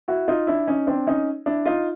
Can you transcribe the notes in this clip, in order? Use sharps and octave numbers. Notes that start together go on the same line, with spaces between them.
E4 F#4
D#4 F4
D4 E4
C#4 D#4
C4 D4
C#4 D#4
D4 E4
D#4 F4